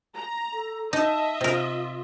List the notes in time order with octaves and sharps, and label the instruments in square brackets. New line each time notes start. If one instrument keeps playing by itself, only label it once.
[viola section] A#5
[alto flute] A4
[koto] D#4 [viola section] D#5 E5 [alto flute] A5
[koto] C3 A#4 [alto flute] F4